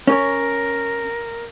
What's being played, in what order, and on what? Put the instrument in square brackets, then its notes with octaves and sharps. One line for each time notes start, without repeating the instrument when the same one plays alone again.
[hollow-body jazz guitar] C#4 C#5 [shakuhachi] A#4